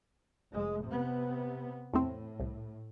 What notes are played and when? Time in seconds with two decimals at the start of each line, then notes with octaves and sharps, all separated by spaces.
0.52 F1 G#3
0.84 C3 B3
1.93 E2 A2 A3 C4
2.40 C2